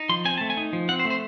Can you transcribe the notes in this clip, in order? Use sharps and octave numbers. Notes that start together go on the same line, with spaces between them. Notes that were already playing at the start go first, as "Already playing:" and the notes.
Already playing: D#4
F3 C6
C4 G#5
A3 A5
G#5
D#4
F3
C4 F#5
C5
A3
C5